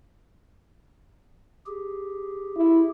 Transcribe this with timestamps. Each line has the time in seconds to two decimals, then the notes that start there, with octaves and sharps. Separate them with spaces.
1.66 G4 G#4
2.57 E4